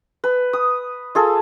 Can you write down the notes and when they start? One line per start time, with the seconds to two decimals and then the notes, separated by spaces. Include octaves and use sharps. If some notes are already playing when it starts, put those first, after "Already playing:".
0.24 B4
0.53 D#6
1.15 F4 G#4 A4